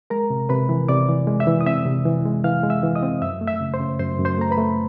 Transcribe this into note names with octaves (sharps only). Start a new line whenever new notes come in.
G#3 A#4 A#5
C3
C3 B4 B5
E3
C3 D5 D6
E3
G#3
E5 E6
E3
D#6
C4 E5 E6
C3
E3
G#3
E3 F5 F6
G#3
E5 E6
E3
D#5 D#6
C4
F#2 E5 E6
A3
E5 E6
C#3
C5 C6
C#3
F#2 C5 C6
F#2
C5 C6
A3 A#5
B4 B5
A3